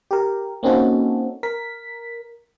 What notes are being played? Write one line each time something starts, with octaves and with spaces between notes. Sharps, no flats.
G4 A#4
A#3 C4 C#4 D#4 F#4 A4
A#4 B6